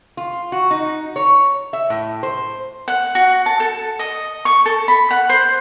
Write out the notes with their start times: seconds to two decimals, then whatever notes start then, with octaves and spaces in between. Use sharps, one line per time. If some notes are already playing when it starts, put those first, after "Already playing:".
0.17 F4
0.52 F#4
0.71 D#4
1.16 C#5
1.73 E5
1.90 A2
2.23 C5
2.88 F#5
3.15 F#4
3.46 A5
3.60 A4
3.99 D#5
4.45 C#6
4.66 A4
4.88 B5
5.11 F#5
5.29 C5